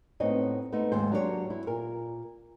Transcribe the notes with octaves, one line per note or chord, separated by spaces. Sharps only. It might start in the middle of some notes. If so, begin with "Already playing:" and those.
A2 B3 C4 D#4 C#5 D#5
A3 B3 D#4 C5
D#2 G#2 C5
F#3 A#3 D4 G4 A#4 C#5
E4
A#2 A#4